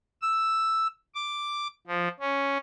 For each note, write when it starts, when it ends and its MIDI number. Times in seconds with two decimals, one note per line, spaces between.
0.22 0.87 88
1.15 1.68 86
1.87 2.08 53
2.20 2.58 61